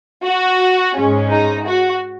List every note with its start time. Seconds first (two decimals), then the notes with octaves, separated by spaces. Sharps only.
0.22 F#4
0.95 G#2 G#3 C#4
1.31 D#4
1.67 F#4